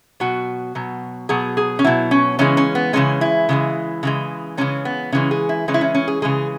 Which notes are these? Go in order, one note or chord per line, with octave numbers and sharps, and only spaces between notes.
B2 F#3 F#4
B2 F#3
B2 F#3 G#4
G#4
C#4
B2 F#3 E4
C#4
C#3 E3 G#3 C#4
C#4
B3
C#3 E3 G#3 C#4
E4
C#3 E3 G#3
C#3 E3 G#3
C#3 E3 G#3 C#4
B3
C#3 E3 G#3 C#4
G#4
E4
C#3 E3 G#3 C#4
E4
C#4
C#4
G#4
C#3 E3 G#3 G#4